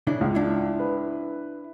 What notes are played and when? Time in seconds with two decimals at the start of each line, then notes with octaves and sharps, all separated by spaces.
0.07 C#3 D4 E4
0.21 C#2 F5
0.35 D4 E4
0.80 B4